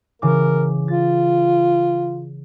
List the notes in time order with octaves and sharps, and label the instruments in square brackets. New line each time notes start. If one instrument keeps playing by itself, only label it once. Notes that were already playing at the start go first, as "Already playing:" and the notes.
[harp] C#3 E3 D6 [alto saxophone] A#4
[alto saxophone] F4 [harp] A6